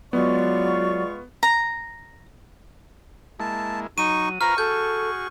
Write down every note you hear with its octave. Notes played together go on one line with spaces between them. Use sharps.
F#3 G#3 B3 F4 D5 C#6
A#5
G#3 A#3 E4 A5
F#3 D#4 C#6 D#7
F4 B4 C5 A#5 C#6 F6
F#4 G#4 A4 G6